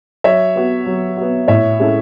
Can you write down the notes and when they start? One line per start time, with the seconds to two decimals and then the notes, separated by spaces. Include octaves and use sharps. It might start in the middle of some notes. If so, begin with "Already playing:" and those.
0.24 F#3 C#5 E5
0.56 B3 F#4
0.86 F#3
1.17 B3 F#4
1.48 A2 C#5 E5
1.80 G#3 C#4 E4 A4